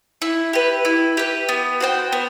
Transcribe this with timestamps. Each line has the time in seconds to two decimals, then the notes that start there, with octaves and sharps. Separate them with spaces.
0.22 E4
0.53 G4 B4
0.85 E4
1.17 G4 B4
1.49 B3
1.80 F#4 C5 G5
2.12 B3